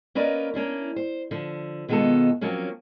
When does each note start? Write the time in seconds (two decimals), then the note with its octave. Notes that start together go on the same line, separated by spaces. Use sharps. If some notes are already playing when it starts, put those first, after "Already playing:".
0.15 A#3 C#4 A#4 B4 D5 D#5
0.54 A#3 C#4 D4 E4
0.96 C5
1.31 D3 F3
1.89 B2 D#3 G#3 B3 F4 A4
2.41 F3 F#3 A#3 C4 C#4